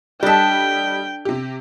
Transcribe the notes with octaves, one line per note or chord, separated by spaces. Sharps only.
G3 D4 A4 D#5 G5 B6
C3 G4